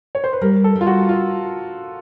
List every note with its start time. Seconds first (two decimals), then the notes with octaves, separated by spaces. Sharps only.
0.15 C#5
0.24 C5
0.33 B4
0.41 G3 A#4
0.64 A4
0.75 G3
0.81 F4
0.87 F#4
1.09 F4